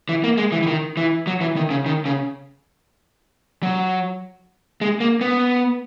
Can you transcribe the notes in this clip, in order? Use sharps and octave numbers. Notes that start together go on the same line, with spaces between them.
E3
A#3
G#3
E3
E3
D#3
E3
F#3
E3
D#3
C#3
D#3
C#3
F#3
G#3
A#3
B3